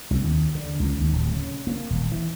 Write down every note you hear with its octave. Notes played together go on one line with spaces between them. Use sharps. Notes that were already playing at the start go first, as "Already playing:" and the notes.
C2
D#2
D3
C#2
D#2
D1
C#3
A#3
D#1
E3